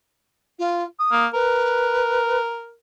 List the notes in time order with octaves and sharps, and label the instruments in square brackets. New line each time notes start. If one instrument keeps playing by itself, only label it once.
[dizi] F4
D#6
[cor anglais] A#3
[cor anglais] A#4 [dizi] B4